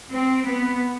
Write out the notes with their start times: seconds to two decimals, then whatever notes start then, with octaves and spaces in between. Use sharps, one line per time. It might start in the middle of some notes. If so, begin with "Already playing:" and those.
0.12 C4
0.47 B3